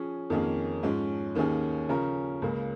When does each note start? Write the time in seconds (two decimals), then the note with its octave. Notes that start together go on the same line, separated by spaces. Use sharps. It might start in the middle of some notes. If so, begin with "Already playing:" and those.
Already playing: F3 C#4 G#4
0.30 F2 D#3 A#3 C#4 G#4
0.83 G#2 F3 G#3 C#4
1.35 D#2 D#3 A#3 C#4 G#4
1.89 C#3 F3 C#4 A#4
2.42 C#2 C#3 A#3